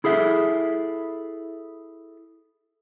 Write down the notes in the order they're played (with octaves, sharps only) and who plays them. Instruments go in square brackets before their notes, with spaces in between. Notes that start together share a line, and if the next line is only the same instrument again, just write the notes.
[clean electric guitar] E4 G#4 A4 E5